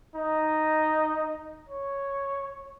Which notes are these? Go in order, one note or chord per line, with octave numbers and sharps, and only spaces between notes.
D#4
C#5